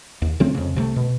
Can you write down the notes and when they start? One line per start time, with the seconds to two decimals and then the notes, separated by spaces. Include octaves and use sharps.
0.22 D#2
0.40 C#3 F#3 A3 C4
0.55 F2 C#3
0.75 C2 C3 F#3 A3
0.96 B2